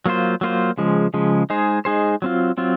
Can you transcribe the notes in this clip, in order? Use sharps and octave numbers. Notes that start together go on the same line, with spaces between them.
F#3 A#3 F4 C5
F#3 A#3 F4 C5
C#3 F3 G#3
C#3 F3 G#3
G#3 D#4 G#4 C5
G#3 D#4 G#4 C5
F#3 C4 F4
F#3 C4 F4